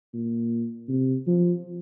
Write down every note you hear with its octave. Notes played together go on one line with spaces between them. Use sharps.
A#2
C3
F3